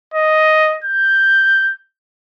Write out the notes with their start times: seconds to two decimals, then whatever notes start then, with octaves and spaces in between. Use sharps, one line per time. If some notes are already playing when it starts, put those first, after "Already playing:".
0.14 D#5
0.84 G6